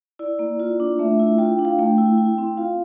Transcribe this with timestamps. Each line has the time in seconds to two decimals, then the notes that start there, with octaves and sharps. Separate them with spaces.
0.19 E4 D5
0.39 A#3
0.60 F4
0.80 D4
0.99 A3 E5
1.19 E4
1.38 F4 G5
1.59 D4
1.65 F5
1.79 A3 G5
1.98 E4
2.18 E4
2.38 C4
2.57 F4 F5